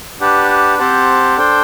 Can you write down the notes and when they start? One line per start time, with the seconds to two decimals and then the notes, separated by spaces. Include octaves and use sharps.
0.20 D4 G4 B4 F#5 A5
0.79 C4 G4 C5 F#5 A5
1.37 D4 A4 C5 G5